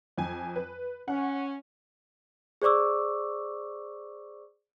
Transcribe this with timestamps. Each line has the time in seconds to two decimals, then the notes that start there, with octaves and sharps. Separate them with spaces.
0.18 F2 G#5
0.56 B4
1.08 C#4 F#5
2.62 G#4 C5 D5 C#6 D6 E6